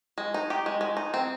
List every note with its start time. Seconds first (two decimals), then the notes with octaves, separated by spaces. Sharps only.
0.18 G#3
0.34 D#4
0.50 G4
0.66 G#3
0.81 G#3
0.97 D#4
1.14 C4